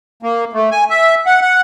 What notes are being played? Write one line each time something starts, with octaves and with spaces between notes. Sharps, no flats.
A#3
A3
G#5
E5
F#5
F#5